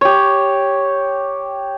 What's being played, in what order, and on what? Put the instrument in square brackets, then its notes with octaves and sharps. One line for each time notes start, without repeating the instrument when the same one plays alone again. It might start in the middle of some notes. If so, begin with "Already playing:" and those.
[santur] G4 C#5